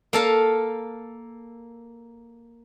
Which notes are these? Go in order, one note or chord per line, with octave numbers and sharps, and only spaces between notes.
A#3 A4 F5